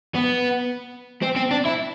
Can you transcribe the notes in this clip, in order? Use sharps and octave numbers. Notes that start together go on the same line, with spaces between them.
B3
C4
C4
D4
E4